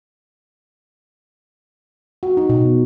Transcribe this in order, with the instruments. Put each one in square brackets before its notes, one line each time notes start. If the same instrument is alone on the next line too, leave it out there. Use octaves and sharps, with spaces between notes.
[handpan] F#4
D#4
B2